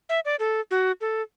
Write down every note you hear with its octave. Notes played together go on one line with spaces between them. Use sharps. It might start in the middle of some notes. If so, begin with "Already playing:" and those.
E5
D5
A4
F#4
A4